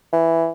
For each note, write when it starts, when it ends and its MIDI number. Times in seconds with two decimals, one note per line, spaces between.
0.13 0.50 52